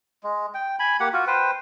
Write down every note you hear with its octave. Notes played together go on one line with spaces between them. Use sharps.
G#3
G5
G#5 B5
A#3 G4 F#5
F4 F#4
B4 C5 G5